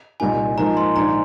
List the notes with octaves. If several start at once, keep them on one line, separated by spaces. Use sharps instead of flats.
C2 A#2 G3 A#3 D#4 G#5
G#2 F3 A#3 D#4 A#5
C6
A#1 G#2 D#3 A#5